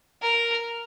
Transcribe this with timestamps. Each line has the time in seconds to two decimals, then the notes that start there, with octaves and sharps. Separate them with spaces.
0.22 A#4